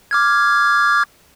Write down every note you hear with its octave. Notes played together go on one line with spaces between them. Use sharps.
D6 F6 G#6